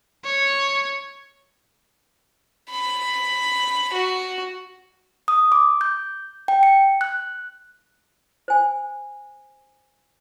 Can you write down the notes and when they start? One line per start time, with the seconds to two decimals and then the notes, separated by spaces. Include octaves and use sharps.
0.25 C#5
2.71 B5
3.93 F#4
5.28 D#6
5.52 D6
5.81 G6
6.48 G5
6.63 C#7
7.01 F#6
8.48 C5 G#5